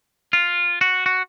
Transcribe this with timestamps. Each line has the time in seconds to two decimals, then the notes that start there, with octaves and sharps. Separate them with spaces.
0.33 F4
0.81 F#4
1.06 F#4